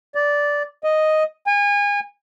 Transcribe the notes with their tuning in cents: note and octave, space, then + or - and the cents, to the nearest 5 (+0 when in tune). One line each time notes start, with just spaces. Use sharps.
D5 -10
D#5 +0
G#5 -30